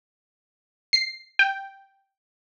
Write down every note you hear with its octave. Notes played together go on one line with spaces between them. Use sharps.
C7
G5